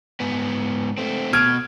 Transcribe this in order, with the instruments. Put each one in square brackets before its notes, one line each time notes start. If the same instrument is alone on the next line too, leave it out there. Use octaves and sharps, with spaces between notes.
[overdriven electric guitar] G#2 B3
A3 C4
[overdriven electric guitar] B2 [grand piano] F6 G#6 D7